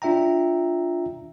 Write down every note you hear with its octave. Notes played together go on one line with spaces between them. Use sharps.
D4 F4 E5 G5 A#5